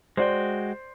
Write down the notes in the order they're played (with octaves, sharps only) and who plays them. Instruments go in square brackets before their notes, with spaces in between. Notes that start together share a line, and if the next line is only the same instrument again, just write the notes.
[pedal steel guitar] G#3 F#4 G5 [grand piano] C5 D5